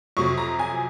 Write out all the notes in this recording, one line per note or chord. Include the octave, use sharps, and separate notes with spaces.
F2 C3 F#3 C#6
A#5
G#5